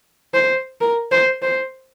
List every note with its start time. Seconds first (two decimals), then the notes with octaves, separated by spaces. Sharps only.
0.34 C5
0.81 A#4
1.12 C5
1.42 C5